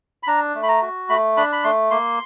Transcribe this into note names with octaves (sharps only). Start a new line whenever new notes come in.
B5
D4 A#5
A3
B5
A#5
F#4
A3 B5
D4 B5
B5
A3 C6
A#3 C6